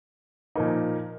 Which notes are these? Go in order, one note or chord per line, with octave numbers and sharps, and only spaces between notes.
A#2 F3 A#3 D#4